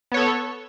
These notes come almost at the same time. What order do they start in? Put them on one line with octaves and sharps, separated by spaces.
B3 C#5 A4